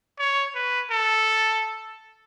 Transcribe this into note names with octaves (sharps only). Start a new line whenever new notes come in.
C#5
B4
A4